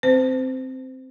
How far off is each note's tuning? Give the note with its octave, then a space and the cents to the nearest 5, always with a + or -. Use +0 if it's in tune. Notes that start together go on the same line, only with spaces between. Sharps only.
C4 +0 C5 -30